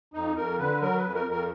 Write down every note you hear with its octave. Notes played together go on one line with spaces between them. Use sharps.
F2 D#4
F2 A#4
D3 B4
F#3 A#4
B4
F2
A#4
F2
A#4